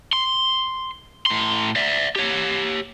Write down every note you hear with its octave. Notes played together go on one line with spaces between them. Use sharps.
C6
A2 C6
D5 E5
G4 C#5